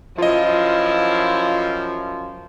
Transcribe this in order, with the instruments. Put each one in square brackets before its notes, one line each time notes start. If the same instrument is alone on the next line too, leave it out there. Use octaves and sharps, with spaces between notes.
[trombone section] F#2 F3 [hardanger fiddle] E4 [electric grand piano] F4 D#5